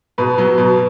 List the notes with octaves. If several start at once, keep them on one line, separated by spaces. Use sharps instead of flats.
B2 B4
F#3 B3
B2